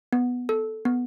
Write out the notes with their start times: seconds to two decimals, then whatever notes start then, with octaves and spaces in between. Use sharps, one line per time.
0.13 B3
0.49 A4
0.85 B3